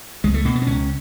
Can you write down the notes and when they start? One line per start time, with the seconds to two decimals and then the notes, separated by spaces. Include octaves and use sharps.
0.24 C#2 G#3
0.34 A3
0.45 B2 A#3
0.55 B3
0.62 C4
0.67 C#2 C#4